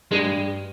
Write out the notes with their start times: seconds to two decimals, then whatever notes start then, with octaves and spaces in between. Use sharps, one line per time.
0.11 G2 G#3